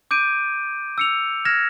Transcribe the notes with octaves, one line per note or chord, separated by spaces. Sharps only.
D6 G6 D7 D#7
E6 C#7 F7
F6 G#6 A#6 E7